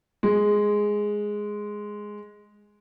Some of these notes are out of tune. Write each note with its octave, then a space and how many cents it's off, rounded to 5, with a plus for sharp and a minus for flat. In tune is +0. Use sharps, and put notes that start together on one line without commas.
G#3 +0